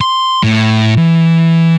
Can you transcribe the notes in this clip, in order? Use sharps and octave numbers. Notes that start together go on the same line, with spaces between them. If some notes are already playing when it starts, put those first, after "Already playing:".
C6
A2
E3